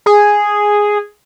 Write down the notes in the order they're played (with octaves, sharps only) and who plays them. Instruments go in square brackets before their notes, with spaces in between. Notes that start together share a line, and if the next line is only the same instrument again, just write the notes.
[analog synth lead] G#4